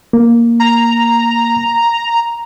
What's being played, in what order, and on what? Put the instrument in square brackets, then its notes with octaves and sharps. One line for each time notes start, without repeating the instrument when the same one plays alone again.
[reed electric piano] A#3
[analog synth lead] A#5